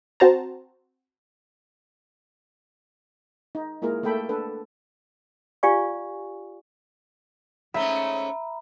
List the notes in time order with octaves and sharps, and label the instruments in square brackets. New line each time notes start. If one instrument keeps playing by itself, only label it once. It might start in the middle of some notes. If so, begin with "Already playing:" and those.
[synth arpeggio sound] C4 F#4 C5 A5 A#5
[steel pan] D#4
G#3 A#3 E4 F4 G#4 A#4
A3 A#3 A4 G5 B5
D4 A4 B4
[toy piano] F4 G4 D5 F5 G#5 C#6
[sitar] G#2 A3 C#4 [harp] E5 [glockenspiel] A#5 B5